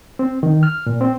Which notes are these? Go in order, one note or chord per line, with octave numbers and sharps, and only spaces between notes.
C4
D#3
F6
A#2
C4